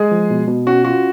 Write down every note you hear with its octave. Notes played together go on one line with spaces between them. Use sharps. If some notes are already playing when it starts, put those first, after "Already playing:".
Already playing: G#3 G#4
F3
B2
B2
C#4 F#4
F4 F#4